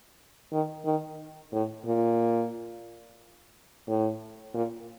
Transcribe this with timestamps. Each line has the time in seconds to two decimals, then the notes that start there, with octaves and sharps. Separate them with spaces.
0.53 D#3
0.85 D#3
1.53 A2
1.86 A#2
3.88 A2
4.54 A#2